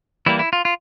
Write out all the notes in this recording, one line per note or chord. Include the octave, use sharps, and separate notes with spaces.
E3 G3 A#3 E4
E4
F4
F4